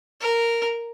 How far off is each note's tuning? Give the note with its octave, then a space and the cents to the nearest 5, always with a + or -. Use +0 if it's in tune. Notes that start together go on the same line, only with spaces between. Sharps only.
A#4 -5